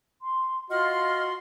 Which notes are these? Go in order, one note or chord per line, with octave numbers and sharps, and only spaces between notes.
C6
F4 F#4 D#5 C6 F6